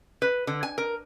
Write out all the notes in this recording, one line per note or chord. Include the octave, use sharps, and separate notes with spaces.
B4
D3
G#5
A#4